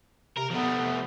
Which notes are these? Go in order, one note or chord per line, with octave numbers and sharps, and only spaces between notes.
C3 A#4
F3 A3 B3